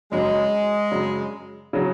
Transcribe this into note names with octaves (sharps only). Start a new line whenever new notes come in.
F#2 C#3 F#3 G#3
F#2 C#3 F#3
C#3 F#3